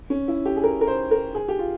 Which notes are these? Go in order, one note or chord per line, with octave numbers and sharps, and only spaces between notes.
C#4
E4
G4
G#4
A#4
A#4
C5
A#4
G#4
G4
F4